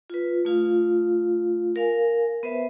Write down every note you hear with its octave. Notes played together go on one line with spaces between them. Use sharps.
F4 B4
A3 F4 F5
A#4 F5 G#5
B3 B4 C5 E5